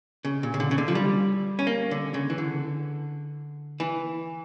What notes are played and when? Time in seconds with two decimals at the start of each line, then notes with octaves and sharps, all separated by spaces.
0.25 C#3
0.43 A#2
0.54 C#3
0.60 D3
0.71 C#3
0.78 D3
0.88 F3
0.95 G3
1.59 C#4
1.67 A#3
1.91 D3
2.14 C#3
2.30 E3
2.38 D3
3.80 E3